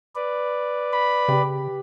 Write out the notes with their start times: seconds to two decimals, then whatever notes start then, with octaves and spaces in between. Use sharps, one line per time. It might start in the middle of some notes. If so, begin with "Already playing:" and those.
0.15 B4 D5
0.94 B5
1.28 C#3 G4